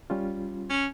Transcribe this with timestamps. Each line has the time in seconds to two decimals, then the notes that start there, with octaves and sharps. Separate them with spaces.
0.10 G3 C#4 F4
0.70 C#4